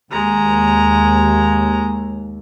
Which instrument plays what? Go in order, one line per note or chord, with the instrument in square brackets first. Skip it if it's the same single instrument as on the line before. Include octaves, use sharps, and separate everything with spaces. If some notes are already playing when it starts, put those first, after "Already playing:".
[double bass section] D#2 [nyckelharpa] G#3 A#5